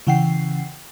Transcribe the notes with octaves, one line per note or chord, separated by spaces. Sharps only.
C#3 E3 F#5 G5 C7